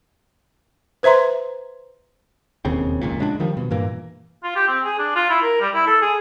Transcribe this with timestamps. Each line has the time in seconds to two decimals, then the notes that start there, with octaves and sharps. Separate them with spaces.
1.03 B4 C5 E5 A#5 C6
2.65 E1 D#2 C#3 C4
3.01 F1 C#2 A#2
3.19 C#3 G#3 C4 D4
3.40 D#3 F3 G3
3.57 B2
3.71 G2 A#2 E3 A#3
4.43 F4
4.56 G4
4.68 C4
4.84 G#4
4.99 D4
5.16 F4
5.30 E4
5.42 A#4
5.61 G3
5.74 E4
5.87 A4
6.02 G#4